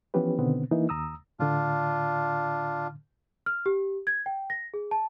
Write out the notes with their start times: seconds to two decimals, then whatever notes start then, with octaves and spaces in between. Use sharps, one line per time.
0.14 E3 F3 B3 C#4 G4 B4
0.39 B2 D3 D#3 B3 C4
0.71 E3 A#3 D#4 E4
0.89 D#2 A#5 D#6 E6
1.39 A2 D3 D4 F4
3.46 F6
3.66 G4
4.07 G#6
4.26 G5
4.50 A#6
4.74 G#4
4.91 A5